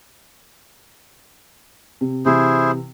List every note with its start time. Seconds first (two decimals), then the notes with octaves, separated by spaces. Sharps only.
2.01 C3
2.25 C3 E3 E4 G#4 C5